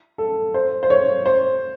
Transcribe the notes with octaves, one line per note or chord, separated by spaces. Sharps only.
A4
C5
C5
C#5
C5